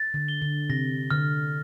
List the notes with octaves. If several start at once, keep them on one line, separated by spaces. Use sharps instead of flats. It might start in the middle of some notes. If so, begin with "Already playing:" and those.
Already playing: A6
D3
G7
D3
C3 A#6
D3 F6